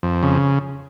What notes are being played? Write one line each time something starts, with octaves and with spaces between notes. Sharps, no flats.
F2
C#3